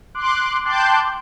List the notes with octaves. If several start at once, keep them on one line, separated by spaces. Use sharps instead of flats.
C6 D6 F#6
G5 A5 C6 D6 F#6 G6